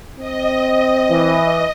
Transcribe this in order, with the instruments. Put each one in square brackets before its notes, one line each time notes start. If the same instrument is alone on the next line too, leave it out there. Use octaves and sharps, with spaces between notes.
[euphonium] C4 [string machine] D#5
[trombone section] E3